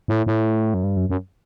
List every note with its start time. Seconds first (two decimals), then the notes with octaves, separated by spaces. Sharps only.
0.08 A2
0.26 A2
0.74 F#2
0.84 G2
0.97 F#2
1.09 F#2